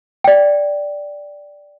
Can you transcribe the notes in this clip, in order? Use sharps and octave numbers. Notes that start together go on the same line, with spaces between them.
D5 G5